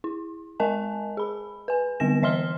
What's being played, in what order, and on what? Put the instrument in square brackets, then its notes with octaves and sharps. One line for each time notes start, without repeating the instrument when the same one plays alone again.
[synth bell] E4
G#3 A#4 D#5 G#5 A5
G#4 B5
B4 G#5
D3 G3 B3 C4 A#6 E7
E3 D#5 E5 C6 F6 G7